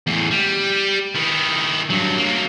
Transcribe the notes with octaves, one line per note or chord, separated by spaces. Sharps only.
E2 A2
G3
D#3 E4
G2 F#3
F#3 A#3